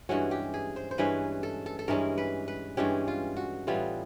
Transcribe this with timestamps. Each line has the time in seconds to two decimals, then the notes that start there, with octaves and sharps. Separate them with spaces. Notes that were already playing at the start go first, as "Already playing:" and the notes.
0.09 G2 E3 G#3 C#4 F#4
0.31 G4
0.54 G#4
0.76 C5
0.91 C5
0.98 G2 E3 G#3 C#4 B4
1.43 A4
1.66 A4
1.79 A4
1.88 G2 E3 G#3 C#4 A#4
2.18 B4
2.48 B4
2.77 G2 E3 G#3 C#4 G4
3.08 F4
3.37 F#4
3.67 A2 E3 G3 B3 F4